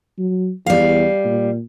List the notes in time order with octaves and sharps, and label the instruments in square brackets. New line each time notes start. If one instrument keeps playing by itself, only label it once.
[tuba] F#3
[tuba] E2 [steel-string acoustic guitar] G3 F5
[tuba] A#2